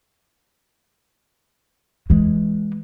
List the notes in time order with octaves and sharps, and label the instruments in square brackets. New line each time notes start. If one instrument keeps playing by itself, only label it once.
[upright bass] E3 G#3